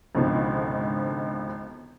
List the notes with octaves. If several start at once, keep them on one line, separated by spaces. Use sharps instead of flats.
G#1 C#2 B2 D3 F3